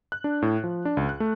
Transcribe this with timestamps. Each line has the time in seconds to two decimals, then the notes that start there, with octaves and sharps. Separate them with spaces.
0.12 F#6
0.24 D4
0.42 A2
0.64 F3
0.85 D4
0.97 C#2
1.09 F#6
1.20 A3